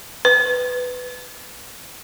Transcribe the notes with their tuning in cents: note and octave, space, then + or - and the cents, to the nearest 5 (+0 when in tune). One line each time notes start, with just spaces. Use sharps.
B4 +15